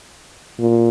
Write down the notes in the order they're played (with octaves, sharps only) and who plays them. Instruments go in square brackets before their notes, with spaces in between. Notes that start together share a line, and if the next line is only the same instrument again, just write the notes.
[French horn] A#2